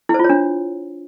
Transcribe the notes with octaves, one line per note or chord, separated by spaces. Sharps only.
E4
C5
F4
C#5
D4